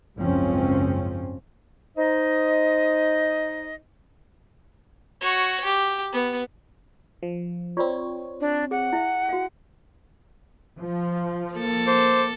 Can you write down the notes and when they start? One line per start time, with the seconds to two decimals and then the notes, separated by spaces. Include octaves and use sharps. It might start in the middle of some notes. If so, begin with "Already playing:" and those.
0.17 F#1 C#2 G#2 F3 C4 C#4
1.97 D#4 C5 D#5
5.21 F#4 C#5
5.64 G4
6.12 B3
7.23 F3
7.77 C4 F4 C#5 D5 B5
8.41 D4
8.71 G#4 F#5
8.93 E4 E5
9.29 F#4 F5
10.79 F3
11.54 A#3 A4
11.87 C5 D6